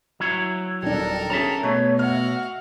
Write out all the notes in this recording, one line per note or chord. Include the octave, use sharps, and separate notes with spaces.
F#3 E4 C#5
D#1 D4 A4 A#4 G5
C#4 G#4 E5 A5 A#5
B2 A3 C#5 C#6
F#4 E5 F5 F6